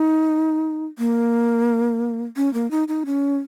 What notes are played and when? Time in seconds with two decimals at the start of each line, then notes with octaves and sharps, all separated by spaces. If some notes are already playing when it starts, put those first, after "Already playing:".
Already playing: D#4
0.98 A#3
2.37 C#4
2.54 A#3
2.71 D#4
2.88 D#4
3.06 C#4